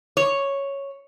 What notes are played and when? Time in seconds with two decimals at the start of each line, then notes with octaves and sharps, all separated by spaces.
0.17 C#5